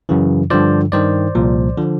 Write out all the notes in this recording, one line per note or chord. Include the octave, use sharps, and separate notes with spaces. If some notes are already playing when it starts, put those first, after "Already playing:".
F#2 C#3 E3
G2 D3 F3 C5 D5
G2 D#3 C5 D5
C2 A#2 F3
D3 F3